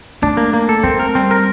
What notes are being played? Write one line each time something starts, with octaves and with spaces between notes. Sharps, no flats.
A3 D4
A#3
A#3
A4
A3 C4
A#4
G3 C4
A#4